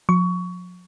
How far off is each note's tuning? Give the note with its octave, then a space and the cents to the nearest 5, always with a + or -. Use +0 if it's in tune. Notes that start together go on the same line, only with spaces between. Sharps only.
F3 +45 C#6 +20